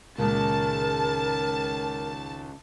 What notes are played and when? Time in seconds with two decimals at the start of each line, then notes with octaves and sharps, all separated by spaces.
0.18 C#2 A#2 D#3 G#3 A#4 A5